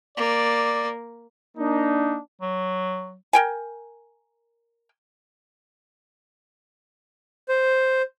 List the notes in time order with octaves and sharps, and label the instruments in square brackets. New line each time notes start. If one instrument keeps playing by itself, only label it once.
[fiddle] A#3 [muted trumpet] D5
[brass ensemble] A#3 D4 D#4
[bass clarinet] F#3
[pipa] A#4 G5 G#5
[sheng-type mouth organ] C5